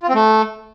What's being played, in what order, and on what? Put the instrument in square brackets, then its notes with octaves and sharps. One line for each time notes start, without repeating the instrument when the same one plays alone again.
[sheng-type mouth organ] F4
C4
A3